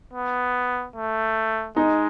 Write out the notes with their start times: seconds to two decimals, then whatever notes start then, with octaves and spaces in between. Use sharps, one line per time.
0.13 B3
0.96 A3
1.76 G#3 D#4